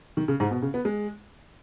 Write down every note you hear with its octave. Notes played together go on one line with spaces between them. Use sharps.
D#3
C#3
G#2
B2
C#3
B3
G#3